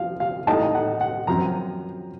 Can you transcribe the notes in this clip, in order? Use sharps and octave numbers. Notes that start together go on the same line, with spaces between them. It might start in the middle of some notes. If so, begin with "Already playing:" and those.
Already playing: F3 F5
F5
A2 A3 D#4 A5
F#5
F#5
F#2 F3 C4 A#5